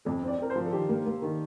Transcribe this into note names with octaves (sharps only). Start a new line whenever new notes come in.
F2 A4
C4 D5
C4 A#4
C5
F3
A4
D#3 G4
A#3
A#3
D#3